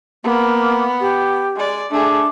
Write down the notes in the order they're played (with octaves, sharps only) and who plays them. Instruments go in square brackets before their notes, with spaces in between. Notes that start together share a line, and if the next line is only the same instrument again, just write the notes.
[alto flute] A#3 [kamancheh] B3
[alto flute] G4
[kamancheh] G#3 D5
[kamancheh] A3 G#4 [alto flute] D4